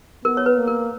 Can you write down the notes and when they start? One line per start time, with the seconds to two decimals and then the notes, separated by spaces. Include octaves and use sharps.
0.25 B3 A#4
0.37 C#5
0.46 B4
0.57 A#3
0.68 A#4